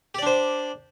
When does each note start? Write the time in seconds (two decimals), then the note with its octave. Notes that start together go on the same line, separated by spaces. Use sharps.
0.15 G4
0.18 D5
0.22 D4
0.26 C5